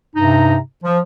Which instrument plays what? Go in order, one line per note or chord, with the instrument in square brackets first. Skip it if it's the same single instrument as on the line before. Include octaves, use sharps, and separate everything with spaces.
[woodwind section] G2 C3 D#4 A#5
F3